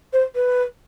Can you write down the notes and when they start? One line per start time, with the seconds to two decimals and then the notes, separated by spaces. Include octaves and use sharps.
0.13 C5
0.36 B4